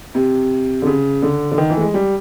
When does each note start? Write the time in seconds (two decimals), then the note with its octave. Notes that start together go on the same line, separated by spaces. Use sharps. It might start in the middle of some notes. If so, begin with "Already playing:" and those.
0.15 C3
0.82 D3
0.87 C#3
1.22 D3
1.52 D3
1.58 D#3
1.70 E3
1.77 A3
1.81 G#3
1.94 G3